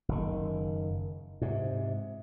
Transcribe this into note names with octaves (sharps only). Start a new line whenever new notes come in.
F#1 D#3
G#2 C3